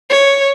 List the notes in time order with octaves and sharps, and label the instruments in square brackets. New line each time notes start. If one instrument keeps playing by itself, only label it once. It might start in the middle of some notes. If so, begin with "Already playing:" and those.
[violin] C#5